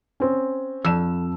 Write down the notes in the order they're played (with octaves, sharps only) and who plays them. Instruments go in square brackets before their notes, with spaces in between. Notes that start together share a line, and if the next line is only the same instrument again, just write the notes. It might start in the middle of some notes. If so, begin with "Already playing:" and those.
[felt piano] C4 C#4
[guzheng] F2 [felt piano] E6 E7